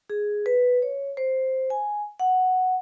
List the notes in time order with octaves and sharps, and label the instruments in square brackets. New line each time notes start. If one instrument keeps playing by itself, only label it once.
[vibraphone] G#4
B4
C#5
C5
G#5
F#5